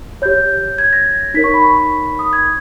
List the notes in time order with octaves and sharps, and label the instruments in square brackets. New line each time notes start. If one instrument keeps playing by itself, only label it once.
[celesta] G4 C#5 G6
G#6
A#6
D#4 A#4 C#5 B6
C#6
B5
C#6
D#6
G#6